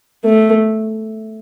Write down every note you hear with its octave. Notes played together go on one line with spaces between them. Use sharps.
A3